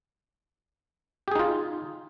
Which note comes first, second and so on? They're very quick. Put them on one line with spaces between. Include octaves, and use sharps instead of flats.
G4 G#4 D#4 F4